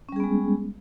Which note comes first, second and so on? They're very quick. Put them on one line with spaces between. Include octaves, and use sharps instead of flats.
C#4 G3 G#4 B3 G#3